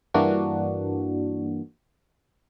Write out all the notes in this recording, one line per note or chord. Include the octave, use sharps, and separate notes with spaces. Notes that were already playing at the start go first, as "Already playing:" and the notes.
G2 E3 A#3 D4 F#4